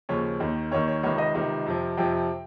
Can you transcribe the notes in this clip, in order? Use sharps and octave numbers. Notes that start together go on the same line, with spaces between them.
D#2 C#3 F3 C#5
D#2 D#3
D#2 D#3 C#5
C#5
C#2 C3 D#3 C#5
D#5
C#2 C3 D#3
F2 C3 F3
F2 C3 F3 G5